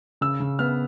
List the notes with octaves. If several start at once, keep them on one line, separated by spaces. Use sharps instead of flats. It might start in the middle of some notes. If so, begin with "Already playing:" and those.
C#3 E6
C#3
B3 F6